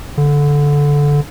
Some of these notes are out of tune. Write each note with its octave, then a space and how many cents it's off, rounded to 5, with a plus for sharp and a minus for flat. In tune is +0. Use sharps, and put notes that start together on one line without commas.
D3 -15